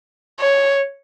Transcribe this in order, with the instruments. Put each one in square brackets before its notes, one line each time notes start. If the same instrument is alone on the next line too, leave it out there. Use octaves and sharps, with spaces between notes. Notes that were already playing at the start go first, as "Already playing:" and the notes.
[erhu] C#5